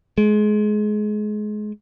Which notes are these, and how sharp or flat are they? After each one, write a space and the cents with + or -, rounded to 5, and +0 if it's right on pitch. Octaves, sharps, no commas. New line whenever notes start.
G#3 +25